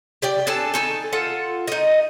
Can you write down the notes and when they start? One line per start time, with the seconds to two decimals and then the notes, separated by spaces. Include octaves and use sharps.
0.22 G4 D5 G5
0.47 D4 A4 G#5 A5
0.74 D#4 A4 G#5
1.13 F4 A4 F#5
1.68 D#4 D#5